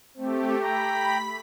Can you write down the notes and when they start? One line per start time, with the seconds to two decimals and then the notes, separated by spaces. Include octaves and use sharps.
0.17 A3 C4 G4
0.62 G5 A#5 B5 B6